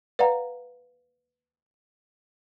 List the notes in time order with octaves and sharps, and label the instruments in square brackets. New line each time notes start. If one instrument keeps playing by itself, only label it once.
[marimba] B4 D5 F5 F#5 A#5